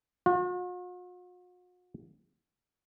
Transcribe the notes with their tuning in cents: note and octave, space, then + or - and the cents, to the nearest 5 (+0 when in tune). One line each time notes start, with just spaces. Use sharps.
F#4 -45